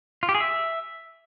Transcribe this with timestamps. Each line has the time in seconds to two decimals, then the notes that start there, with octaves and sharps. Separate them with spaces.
0.23 F4
0.29 G4
0.35 G#4
0.40 E5